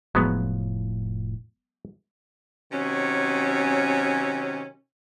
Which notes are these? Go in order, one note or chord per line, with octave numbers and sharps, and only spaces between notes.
F1 A2 F3 F#3 G#3 B3
C3 D#3 F#3 C#4